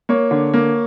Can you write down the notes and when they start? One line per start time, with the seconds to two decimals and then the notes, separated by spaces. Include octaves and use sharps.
0.09 A#3 C#5
0.31 D3
0.54 A#3